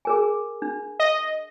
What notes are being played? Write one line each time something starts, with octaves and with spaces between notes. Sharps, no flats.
G#4 A#4 G#5
D4
D#5